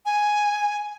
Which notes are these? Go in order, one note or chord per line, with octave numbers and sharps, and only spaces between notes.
G#5